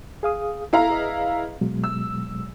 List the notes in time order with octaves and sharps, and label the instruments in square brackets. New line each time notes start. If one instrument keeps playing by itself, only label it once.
[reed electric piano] G#4 F5 D#6
[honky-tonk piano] E4 F5 A#5 [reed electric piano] A4
[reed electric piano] G#4 B4 D#5
B2 F#3 G#3
[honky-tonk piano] E6